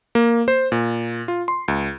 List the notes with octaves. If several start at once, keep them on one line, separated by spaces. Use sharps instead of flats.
A#3
C5
A#2
F4
C6
C#2